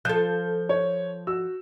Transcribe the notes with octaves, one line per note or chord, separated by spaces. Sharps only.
F3 A4 G6
C#5
F#4 E6